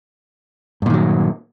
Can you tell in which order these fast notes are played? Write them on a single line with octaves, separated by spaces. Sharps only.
G2 A#2 D#3 F#3